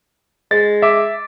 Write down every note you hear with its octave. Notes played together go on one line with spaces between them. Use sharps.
G#3 A6
E5 D6